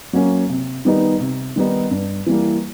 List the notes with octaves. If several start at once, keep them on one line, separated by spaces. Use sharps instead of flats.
F#3 A#3 C#4
C3
D#3 G3 B3 D#4
C3
D#3 G3 B3 D#4
G2
E3 G3 A#3